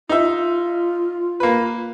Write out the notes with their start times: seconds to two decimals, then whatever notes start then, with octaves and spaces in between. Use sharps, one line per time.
0.09 D#4 F4 E5
1.40 A#3 B4